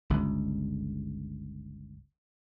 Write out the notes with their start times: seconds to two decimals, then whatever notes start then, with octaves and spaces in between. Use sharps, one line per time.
0.10 G1 C#2